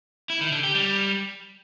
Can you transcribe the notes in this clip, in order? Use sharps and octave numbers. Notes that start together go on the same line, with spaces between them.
E4
D#3
D3
G4
G3